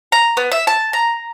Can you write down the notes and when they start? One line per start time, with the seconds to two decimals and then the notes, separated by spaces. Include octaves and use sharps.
0.12 A#5
0.37 B3
0.52 E5
0.67 A5
0.93 A#5